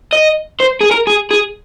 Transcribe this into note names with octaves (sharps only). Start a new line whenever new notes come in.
D#5
C5
G#4
A#4
G#4
G#4